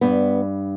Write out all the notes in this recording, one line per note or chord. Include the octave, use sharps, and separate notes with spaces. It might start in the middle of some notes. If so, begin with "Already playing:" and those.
G2 B3